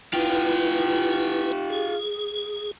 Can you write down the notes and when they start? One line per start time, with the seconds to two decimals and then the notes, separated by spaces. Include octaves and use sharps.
0.14 E4 F4 G4 B4
1.70 G#4